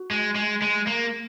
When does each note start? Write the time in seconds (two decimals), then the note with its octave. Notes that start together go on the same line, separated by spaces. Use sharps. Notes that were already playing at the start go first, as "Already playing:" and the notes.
Already playing: F#4
0.11 G#3
0.35 G#3
0.62 G#3
0.87 A#3